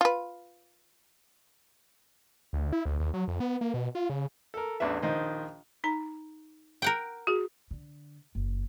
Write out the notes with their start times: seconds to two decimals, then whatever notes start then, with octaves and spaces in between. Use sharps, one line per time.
0.01 F4 B4
2.53 D2
2.72 E4
2.85 D2
3.00 D#2
3.14 F#3
3.28 F2
3.40 B3
3.61 A#3
3.74 B2
3.95 F4
4.10 C#3
4.54 A4 A#4
4.80 A1 E2 D4 B4 E5
5.02 A#1 D#3 C5 D#5
5.84 D#4 A#5
6.82 A#4 F#5 G5
7.27 F#4 G#4
7.71 D3
8.35 F#1